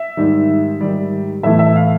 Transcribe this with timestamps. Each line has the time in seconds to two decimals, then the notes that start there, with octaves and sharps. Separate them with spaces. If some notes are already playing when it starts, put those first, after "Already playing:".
Already playing: E5
0.17 G#2 D#3 G3
0.81 G#2 D#3 G3
1.43 A2 E3 A3 E5
1.59 E5
1.76 F5